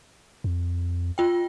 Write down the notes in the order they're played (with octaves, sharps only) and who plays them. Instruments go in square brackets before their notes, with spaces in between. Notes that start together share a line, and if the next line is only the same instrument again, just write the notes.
[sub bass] F2
[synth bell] F4 G5